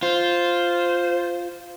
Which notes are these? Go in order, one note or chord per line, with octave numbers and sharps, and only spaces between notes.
F4 C5